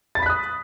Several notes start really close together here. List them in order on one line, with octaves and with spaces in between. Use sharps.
A6 B5 B6 F#6 D#6